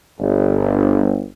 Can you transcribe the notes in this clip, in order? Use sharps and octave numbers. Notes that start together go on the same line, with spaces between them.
G1